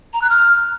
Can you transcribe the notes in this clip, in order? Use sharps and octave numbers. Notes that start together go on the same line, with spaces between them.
A#5
F#6
F6